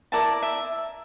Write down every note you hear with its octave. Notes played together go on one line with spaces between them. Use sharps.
E4 A#4 D5 A5
E5